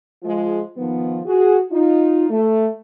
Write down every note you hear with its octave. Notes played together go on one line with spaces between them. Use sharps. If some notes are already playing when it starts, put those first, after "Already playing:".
F3 G#3 F4
D#3 F3 B3
F#4 G#4
D#4 F4
A3